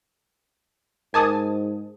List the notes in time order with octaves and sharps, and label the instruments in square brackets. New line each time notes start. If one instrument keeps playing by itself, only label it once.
[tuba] G#2 [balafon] A#4 D#5 D6 [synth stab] G#5 A5 D#6